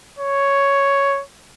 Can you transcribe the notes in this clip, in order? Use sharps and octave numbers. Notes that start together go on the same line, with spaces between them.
C#5